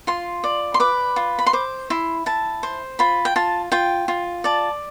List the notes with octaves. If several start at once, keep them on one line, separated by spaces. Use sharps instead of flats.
F4 C6
D5
C6
B4 D6
F4
B5
C6
C5 D6
E4 C6
E4 A5
C5
F4 B5
G5
F4 A5
F4 G5
F4
D5 A5